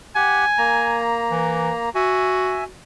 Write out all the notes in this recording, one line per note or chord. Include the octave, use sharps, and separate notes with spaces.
G4 F#5 G#5
A#3 A#5
E3
F#4 E5 G#5